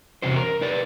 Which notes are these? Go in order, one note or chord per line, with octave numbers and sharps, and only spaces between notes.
E2 C3 C#4 F#4 C5
A#4
D#4 B4 D5